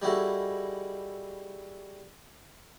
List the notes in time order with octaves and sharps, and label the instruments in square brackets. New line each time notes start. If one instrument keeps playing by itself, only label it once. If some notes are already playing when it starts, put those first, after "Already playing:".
[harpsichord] G3 D#4 E4 F#4 G#4 A4